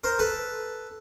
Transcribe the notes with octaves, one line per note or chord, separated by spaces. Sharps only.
A#4 C5
A4 B4